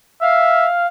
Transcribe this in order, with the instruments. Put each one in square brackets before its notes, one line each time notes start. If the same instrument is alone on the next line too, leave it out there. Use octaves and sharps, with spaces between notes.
[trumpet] E5 [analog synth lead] F5